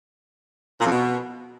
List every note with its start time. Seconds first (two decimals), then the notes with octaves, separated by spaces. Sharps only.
0.81 A#2
0.86 F2
0.91 B2